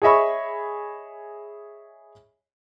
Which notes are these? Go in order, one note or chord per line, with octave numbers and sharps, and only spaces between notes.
G#4 C#5 D#5 E5 B5 C#6